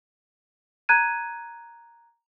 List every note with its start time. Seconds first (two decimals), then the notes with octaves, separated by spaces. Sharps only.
0.89 A#5 F#6 G#6 D#7